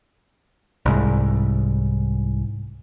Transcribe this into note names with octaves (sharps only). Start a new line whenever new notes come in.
C2 G#2